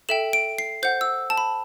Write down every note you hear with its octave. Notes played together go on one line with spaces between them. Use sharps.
A4 E5 G5 E7
D7
C7
C5 F#5 G6
E6
A5
B5